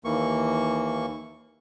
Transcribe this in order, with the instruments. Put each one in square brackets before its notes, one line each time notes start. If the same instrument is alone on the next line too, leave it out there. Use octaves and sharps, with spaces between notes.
[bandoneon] D#2 E3 A#3 C#6